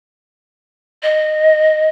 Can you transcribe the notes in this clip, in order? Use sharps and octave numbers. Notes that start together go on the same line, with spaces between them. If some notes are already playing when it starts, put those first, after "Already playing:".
D#5